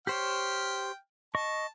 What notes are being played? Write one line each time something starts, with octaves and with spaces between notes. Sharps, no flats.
G4 C5 C#5 G5 F6
D#5 A5 C#6